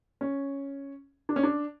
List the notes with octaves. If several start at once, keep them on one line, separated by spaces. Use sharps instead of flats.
C#4
D4
C#4
D4